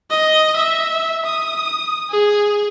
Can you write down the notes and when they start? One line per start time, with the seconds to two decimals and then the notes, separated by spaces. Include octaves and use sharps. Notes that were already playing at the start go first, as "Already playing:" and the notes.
0.10 D#5
0.56 E5
1.25 D#6
2.10 G#4